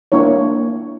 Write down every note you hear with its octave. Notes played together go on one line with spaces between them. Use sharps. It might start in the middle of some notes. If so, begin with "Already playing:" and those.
A#3 D4 E4 C#5